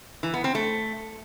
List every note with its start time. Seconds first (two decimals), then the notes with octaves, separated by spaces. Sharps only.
0.23 E3
0.34 B3
0.44 C4
0.55 A3